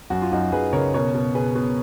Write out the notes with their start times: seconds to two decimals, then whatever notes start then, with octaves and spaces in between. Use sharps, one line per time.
0.10 F#2 F#4
0.22 F4
0.32 F#2 D#4 F#4
0.52 F#2 G#4 B4
0.73 C#3 A#4 C#5
0.94 B2 A#4 C#5
1.14 B2
1.35 B2 G#4 B4
1.55 B2